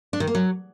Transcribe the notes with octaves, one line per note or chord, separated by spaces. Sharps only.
D4
D#3
A#3
F#3